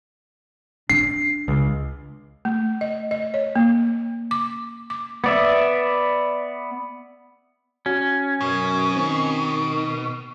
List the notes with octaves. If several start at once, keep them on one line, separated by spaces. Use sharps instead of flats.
D4 C7
C#2
A3
D#5
D#5
C#5
A#3
D6
D6
B3 D5 E5
C#4 F#4
F#2 B2
D#3 C4